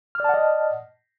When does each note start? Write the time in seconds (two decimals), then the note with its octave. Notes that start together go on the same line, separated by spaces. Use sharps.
0.15 F6
0.20 D5
0.24 A5
0.29 F#5
0.34 D#5